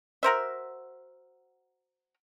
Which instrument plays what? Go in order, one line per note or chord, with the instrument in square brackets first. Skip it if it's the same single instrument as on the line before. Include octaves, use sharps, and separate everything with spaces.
[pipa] F#4 A#4 C5 E5